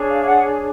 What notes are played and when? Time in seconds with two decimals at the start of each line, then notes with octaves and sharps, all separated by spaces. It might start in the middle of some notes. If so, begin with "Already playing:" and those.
Already playing: D4 G#4 C#5
0.09 F5
0.22 F5
0.26 F#5